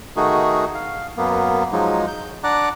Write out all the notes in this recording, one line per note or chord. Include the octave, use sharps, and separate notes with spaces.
D#3 A3 D#4 F#4 G#4
F5
F#2 A#3 B3
F3 F#3 G#3 D#4
G6
D4 D5 F#5 A#5 D6 F#6